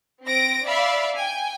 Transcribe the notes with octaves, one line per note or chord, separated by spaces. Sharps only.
C4 A#6 D7
D5 E5 F5 B5
G5 G#5